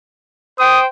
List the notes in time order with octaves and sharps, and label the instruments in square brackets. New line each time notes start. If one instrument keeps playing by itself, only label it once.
[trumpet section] C5 G5 [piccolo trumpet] D#6